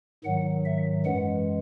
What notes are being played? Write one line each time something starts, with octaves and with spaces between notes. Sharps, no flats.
G#2 D#3 F#3 F#5
E5
F#2 E3 G#3 F#5